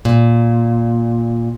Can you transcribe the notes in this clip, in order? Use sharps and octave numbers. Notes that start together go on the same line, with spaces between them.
A#2